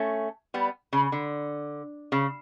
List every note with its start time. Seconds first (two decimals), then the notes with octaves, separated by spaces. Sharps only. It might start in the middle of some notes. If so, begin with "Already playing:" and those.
Already playing: A3 C#4
0.54 G3 B3
0.93 C#3
1.12 D3
2.12 C#3